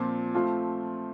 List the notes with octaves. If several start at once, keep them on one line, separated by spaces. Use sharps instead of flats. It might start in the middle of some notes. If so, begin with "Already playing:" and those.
Already playing: A#2 F3 C4
F3 A3 C4 F4